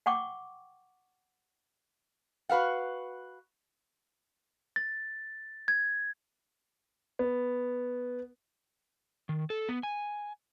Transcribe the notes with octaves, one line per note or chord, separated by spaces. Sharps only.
F#5 G5 C#6 D6
F#4 B4 F5 F#5
A6
G#6
B3
D#3
A4
B3
G#5